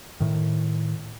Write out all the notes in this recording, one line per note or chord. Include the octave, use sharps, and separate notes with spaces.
A2 D#3